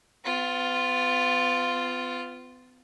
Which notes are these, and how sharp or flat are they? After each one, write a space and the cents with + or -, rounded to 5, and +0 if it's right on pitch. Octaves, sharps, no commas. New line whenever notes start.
B3 +40 F4 +0